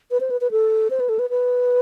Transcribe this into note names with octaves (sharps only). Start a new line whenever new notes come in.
B4
C5
B4
B4
A4
C5
B4
A4
B4
B4